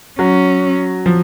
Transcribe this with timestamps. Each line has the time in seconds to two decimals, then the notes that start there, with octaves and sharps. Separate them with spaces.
0.19 F#3 C#4
1.06 F3